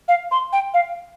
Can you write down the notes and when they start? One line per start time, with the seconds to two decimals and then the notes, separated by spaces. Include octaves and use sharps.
0.08 F5
0.31 C6
0.53 G5
0.74 F5